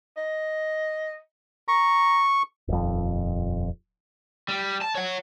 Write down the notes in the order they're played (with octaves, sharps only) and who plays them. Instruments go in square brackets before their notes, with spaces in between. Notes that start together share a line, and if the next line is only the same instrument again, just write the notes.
[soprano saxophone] D#5
[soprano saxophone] A#5 [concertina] C#6
[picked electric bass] D#1 F2
[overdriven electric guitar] G3
A5
C#5 F#5